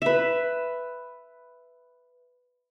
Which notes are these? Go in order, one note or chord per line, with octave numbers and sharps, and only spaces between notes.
B4 E5